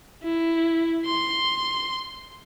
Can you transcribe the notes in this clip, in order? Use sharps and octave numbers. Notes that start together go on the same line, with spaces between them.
E4
C6